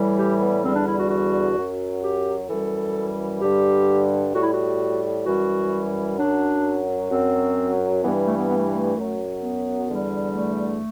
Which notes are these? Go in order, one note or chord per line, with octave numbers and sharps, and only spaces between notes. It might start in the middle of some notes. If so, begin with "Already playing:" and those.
Already playing: A2 E3 G3
G4
B3
E2 D3 G3 C4
D4
E4
F#4
F#4
F#2 F#3
G4
F#2 E3 G3 A4
G2 D3 G3 G4
A2 G3 F#4
E4
F#4
F#2 E3 G3 F#4
F#2 F#3 D4
F#2 F#3 C4
G2 E3 G3 B3
A3
B3
B3
A3
A3
F#2 F#3
B3
E2 D3 G3
A3